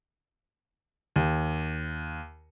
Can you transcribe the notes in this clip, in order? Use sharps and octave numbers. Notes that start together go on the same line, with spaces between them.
D#2